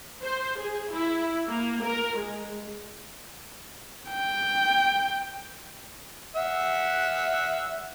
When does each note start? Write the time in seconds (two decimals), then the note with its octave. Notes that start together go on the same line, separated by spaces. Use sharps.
0.22 C5
0.58 G#4
0.91 E4
1.48 A#3
1.82 A#4
2.16 G#3
4.11 G5
6.36 E5 F#5